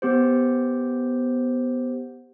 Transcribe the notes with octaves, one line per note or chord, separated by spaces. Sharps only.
B3 G4 C5